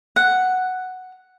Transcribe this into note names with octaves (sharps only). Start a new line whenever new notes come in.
F#5